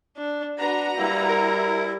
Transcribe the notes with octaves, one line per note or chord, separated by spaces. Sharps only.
D4
D4 F#4 B4 A#5
G3 A#3 E4
A#4